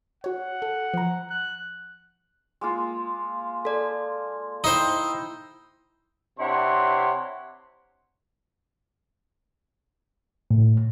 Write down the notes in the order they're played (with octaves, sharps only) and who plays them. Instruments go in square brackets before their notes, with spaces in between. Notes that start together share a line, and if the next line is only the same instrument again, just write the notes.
[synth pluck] F#4 C#5 [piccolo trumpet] F#5
[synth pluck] A4
F3 A#5
[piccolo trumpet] F#6
[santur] G#3 A#3 F4
[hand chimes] A4 D5
[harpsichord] D#4 C5 [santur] E4 G5
[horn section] C3 D4 E4 C#5 F#5 C6
[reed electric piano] A2